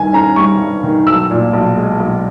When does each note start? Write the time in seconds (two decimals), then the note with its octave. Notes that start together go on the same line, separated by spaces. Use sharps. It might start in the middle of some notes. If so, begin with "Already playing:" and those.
Already playing: G2 D#3 G#5
0.13 C#4 A#5
0.36 G3 C#6
0.61 G2
0.83 D#3
1.07 B1 E6
1.31 A#2
1.53 B1
1.76 G#3
2.00 B1